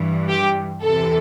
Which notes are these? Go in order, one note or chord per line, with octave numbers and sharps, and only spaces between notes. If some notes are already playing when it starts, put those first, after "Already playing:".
Already playing: G2 E3
G4
E2 C3 E3 A4